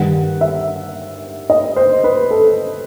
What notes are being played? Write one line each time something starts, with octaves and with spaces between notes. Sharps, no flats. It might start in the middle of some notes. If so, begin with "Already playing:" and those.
Already playing: G2 D#3 F#5
E5
D#5
C5
B4
A4